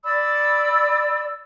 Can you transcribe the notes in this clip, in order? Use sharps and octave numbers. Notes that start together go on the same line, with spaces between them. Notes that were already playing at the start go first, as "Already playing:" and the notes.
D5 B5 E6